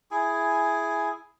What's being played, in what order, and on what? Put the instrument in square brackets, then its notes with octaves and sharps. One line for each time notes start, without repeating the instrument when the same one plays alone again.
[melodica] E4 G#4 G#5